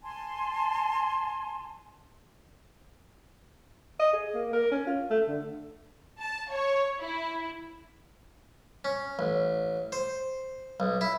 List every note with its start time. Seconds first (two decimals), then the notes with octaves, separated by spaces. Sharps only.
0.03 G#5 A5 C6
3.99 D#5
4.13 G#4
4.34 A#3
4.53 A#4
4.71 C#4
4.87 F4
5.10 A3
5.27 D3
6.19 A5
6.51 C#5
6.99 E4
8.84 C#4
9.19 A1
9.92 C5
10.80 B1
11.01 E4